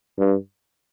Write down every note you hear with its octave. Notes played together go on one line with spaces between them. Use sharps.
G2